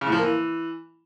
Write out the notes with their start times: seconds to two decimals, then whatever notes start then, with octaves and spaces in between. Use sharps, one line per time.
0.01 C#3
0.07 A2
0.12 F3
0.17 A#3
0.23 E3